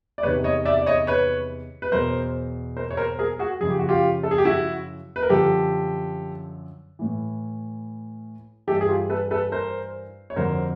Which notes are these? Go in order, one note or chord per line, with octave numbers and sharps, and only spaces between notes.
D5
E2 C3 D#3 B4 C#5
C#5 D#5
D5 E5
D5
C#5 D#5
B4 C#5
B4
E2 B2 F#3 A#4 C5
A#4 C5
C#5
A#4 C5
G#4 A#4
F#4 G#4
F#2 C#3 F3 G#4
G4
F#4
F4 G4
A4
G#4
G4
E4 F#4
B4
A#4
F#2 D3 F3 G4 A4
A2 E3
G2 E3 G4 A4
G#4
F4 G4
A4 B4
A4 B4
A#4 C5
C#5
F2 D3 F#3 A#4 C5